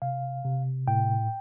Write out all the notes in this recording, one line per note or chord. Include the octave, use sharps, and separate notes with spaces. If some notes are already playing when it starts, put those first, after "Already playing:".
C3 F5
C3
A2 G5